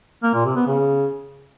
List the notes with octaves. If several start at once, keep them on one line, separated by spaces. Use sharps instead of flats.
A#3
A#2
C3
B3
C#3